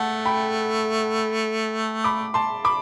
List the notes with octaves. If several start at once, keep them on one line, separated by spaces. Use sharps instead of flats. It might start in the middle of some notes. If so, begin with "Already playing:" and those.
Already playing: A3 F#5 A5
G5 B5
B5 D6
A5 C6
B5 D6